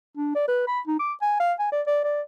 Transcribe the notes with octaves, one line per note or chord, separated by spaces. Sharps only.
D4
D5
B4
B5
D#4
D6
G#5
F5
G#5
D5
D5
D5